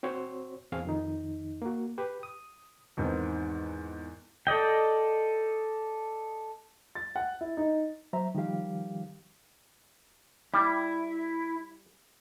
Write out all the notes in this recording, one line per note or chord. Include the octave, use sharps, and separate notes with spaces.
C4 F#4 C5 C#5
E2 C4 G#4 F5
F2 D#3 D#4
A#3 F#4
G4 B4
D#6
E2 G#2 D#3 C4
A4 D5 D#5 G5
A6
F#5
E4
D#4
F#3 C5 E5 A#5
D#3 F3 G3 G4 F5
G3 E4